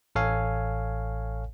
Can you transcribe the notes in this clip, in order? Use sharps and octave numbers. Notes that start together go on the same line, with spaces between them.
A1 A4 C#5 F5 G#5